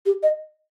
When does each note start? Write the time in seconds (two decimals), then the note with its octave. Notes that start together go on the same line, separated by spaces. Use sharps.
0.06 G4
0.23 D#5